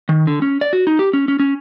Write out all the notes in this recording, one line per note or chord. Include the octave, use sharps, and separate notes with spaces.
D#3
D3
C#4
D5
F#4
D#4
G4
C#4
C#4
C#4